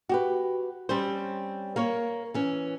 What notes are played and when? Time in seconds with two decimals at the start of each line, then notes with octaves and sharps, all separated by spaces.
0.09 F#4 G4 B4
0.89 G3 C4 C#4 C5
1.76 A#3 A#4 C#5
2.34 E3 C#4